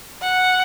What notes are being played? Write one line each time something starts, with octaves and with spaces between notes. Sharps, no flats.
F#5